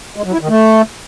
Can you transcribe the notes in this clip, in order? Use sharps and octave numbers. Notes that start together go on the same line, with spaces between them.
G#3
F#3
E4
D#3
A3